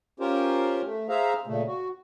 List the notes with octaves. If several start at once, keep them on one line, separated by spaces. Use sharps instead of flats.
C#4 F4 G4 A#4 C5
A3
G#4 C5 E5 F5 A#5
A#2 C#3 A3
F#4